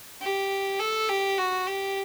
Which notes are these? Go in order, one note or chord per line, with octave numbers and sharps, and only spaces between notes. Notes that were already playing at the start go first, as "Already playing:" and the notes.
G4
A4
G4
F#4
G4